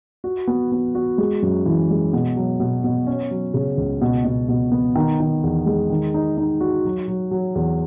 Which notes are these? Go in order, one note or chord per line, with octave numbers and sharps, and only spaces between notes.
F#4
B3
B3
F#4
G#3
F#2
E3
G#3
B2
F#3
B2
B2
C#4
F#3
C#3
C#2
B2
B2
B2
B3
D#3
D#3
E2
G#3
D#3
D#4
D#4
F#4
F#3
F#3
F#3
E2